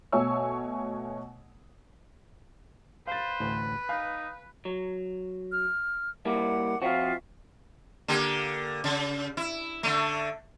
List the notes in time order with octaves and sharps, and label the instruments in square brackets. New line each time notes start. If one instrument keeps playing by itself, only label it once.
[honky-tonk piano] B2 A3 C#5 G#5 C#6 E6
[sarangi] B4 [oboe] C5 [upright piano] F5 A6
[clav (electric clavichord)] A1 D2 A2
[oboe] D#4 [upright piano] F5 [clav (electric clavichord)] G#5
[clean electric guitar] F#3
[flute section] F6
[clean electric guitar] G3 A#3 E4 [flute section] F#5 D6
[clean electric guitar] F3 C4 F#4 [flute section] F4 E5 F5
[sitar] D3 A#3 G4
C#3
E4
D3 A3